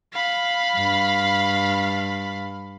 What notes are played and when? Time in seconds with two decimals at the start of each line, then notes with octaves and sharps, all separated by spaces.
0.13 F5 B5
0.75 G2